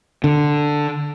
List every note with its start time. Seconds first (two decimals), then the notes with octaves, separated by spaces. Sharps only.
0.24 D3